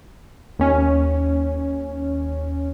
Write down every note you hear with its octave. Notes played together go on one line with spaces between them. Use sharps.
D#2 C#4